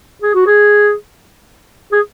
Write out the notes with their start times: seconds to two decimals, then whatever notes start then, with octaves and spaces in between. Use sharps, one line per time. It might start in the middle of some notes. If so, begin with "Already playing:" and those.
0.22 G#4
0.34 F#4
0.46 G#4
1.92 G#4